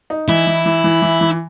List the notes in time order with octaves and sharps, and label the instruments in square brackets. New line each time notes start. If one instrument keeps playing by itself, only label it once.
[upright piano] D#4
[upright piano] E3 [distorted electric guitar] E4
[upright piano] E3
E3
E3
E3
E3